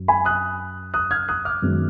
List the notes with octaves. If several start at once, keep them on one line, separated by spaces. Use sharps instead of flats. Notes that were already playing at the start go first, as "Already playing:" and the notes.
Already playing: F#2
G#5 B5
D#6 F#6
D#6 F#6
F6 G#6
D#6 F#6
D6 F6
F#2 D#3 G#3 B3